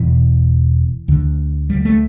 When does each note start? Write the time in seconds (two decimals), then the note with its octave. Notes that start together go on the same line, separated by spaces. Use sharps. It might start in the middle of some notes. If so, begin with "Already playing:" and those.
Already playing: E1 B2 E3
1.08 D2 D3
1.70 G3
1.85 A3